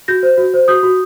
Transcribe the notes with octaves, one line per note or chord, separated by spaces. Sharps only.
F#4 G6 A#6
C5
F#4
C5
F#4 D#6 G6
F#4